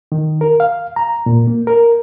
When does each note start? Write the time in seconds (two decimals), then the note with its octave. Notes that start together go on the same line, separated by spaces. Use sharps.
0.12 D#3
0.41 A#4
0.60 F5
0.96 A#5
1.26 A#2
1.47 A#3
1.67 A#4